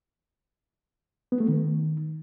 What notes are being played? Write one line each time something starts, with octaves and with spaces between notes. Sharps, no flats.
B3
A3
D#3